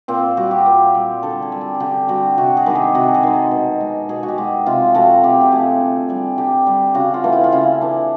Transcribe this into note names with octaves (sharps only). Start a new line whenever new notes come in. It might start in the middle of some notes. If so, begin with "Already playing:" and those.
A#2 C4
G3 F#4
G4
A#2
G3
D3 A4
G#4
G3
G#4
G#4
D3 G4
G3 F#4
C3 F#4
G#4
D#3 G#3 G4
G#4
C3 F#4
G#4
D#3 G#3
A4
B2
G#3
B2 G#4
F#4
G4
G#3
C3 F4
F3 A3 F#4
C3 G4
G4
F3 A3 G#4
D3
G3 G#4
D3 G4
G3
C#3 F#4
F4
E3 A3
E4
F4
C#3 E4
E3 A3 D4